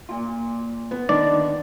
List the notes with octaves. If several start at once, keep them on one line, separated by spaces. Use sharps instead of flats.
A#2 F4
B3
D3 D#3 D5